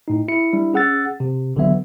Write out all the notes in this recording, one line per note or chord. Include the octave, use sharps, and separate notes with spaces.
A2 D#4
E4 C#7
G3 D4 E4
C#4 G#4 F#5 E6 A6
C3
A1 D3 D#3 F#3 B3 E5